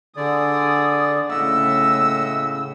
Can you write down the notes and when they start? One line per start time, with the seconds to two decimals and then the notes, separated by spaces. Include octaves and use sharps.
0.17 D3 G#4 D5 D#6
1.31 A2 C#3 D#5 E5 F#5 E6